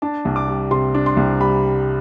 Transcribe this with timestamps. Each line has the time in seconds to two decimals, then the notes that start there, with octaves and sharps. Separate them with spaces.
0.02 D4 A5
0.25 C2
0.36 D6
0.48 G3
0.71 C3 C6
0.94 D4
1.06 C6
1.17 C2
1.40 G3 B5